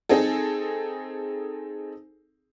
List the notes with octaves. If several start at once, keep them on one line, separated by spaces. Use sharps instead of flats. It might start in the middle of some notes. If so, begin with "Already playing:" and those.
C4 D#4 G#4 A4